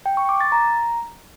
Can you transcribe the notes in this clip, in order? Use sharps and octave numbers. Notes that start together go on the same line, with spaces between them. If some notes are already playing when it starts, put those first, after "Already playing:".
G5
C#6
D6
A6
A#5